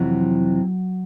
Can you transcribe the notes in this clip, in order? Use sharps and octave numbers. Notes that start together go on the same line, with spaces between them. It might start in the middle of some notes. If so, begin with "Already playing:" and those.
Already playing: F2 C3 E3 F#3